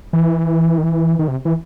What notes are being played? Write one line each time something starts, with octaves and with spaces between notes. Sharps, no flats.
E3
D#3
E3
D#3
C3
E3